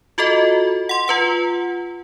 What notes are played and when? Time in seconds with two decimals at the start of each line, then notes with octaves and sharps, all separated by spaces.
0.18 F4 F#4 A4 D#5
0.89 F#5 C6
1.08 F4 B4 F#5